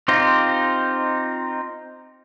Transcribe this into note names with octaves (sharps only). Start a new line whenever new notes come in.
C4 D#4 F4 G4 C5